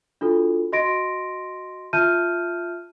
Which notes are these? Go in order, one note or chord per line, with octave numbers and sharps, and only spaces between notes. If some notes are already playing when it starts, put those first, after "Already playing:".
D4 F4 F#4 A4
F#4 D#5 C6 A#6 D7
F4 E5 A5 F6 G6 D#7